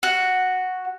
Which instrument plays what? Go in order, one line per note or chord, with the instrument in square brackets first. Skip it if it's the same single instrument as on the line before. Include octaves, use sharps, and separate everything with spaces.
[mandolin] F#4